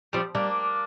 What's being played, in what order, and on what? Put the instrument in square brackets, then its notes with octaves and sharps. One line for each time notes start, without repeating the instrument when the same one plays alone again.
[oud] F3 [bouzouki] G3 C4
[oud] G3 [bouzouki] A#3 D4